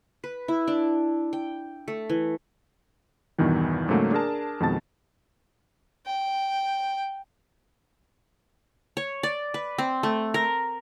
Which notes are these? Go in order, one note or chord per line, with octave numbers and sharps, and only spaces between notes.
B4
E4
D4
G5
A3
E3
E2 G2 B2 D#3 E3
G#2 C#3 F#3 A3 A#3
D4 G#4 A#4 A5
F2 B2 D#3 G#3 A5 A6
G5
C#5
D5
B4
C4
A3
A#4